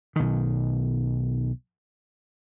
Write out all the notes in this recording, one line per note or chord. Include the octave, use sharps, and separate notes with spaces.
B1 D#3